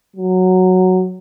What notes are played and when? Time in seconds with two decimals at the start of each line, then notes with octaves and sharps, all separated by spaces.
0.16 F#3